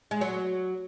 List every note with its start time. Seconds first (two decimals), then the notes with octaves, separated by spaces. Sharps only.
0.11 G#3
0.21 F#3